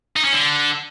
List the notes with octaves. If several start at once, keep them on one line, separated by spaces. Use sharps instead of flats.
D#4
C#4
D3